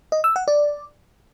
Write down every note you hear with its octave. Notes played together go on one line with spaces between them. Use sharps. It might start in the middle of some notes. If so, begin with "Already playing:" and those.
D#5
E6
F#5
D5